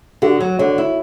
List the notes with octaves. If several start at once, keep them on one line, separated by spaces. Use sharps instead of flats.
D3 F#4
F#3
D3 C#5
E4